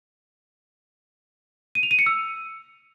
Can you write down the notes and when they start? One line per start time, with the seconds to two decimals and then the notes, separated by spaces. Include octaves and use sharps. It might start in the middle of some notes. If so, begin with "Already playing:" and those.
1.75 D#7
1.83 F7
1.91 D#7
1.99 C#7
2.06 E6